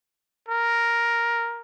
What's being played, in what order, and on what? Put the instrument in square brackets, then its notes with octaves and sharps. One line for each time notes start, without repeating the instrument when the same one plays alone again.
[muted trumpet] A#4